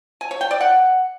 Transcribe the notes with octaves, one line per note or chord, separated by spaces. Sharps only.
G#5
C#5
G5
D5
F#5